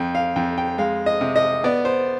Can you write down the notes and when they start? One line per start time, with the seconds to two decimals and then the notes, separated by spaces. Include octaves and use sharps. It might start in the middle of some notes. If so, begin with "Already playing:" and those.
Already playing: F2 G5
0.15 F5
0.36 F2 G5
0.58 G5
0.78 G#3 F5
1.06 D#5
1.21 C3
1.36 D#5
1.64 B3 D5
1.85 C5